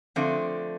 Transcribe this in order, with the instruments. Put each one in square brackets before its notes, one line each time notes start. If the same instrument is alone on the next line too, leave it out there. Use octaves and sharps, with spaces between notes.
[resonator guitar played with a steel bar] D3 F3 A3 C4